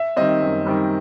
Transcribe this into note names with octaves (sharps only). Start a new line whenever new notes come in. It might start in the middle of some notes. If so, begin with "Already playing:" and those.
Already playing: E5
D#3 G3 C4 D#5
F#2
D#3 G3 C4